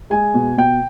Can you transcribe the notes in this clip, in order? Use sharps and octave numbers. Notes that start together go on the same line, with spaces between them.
G#3 G#5
B2
B2 G5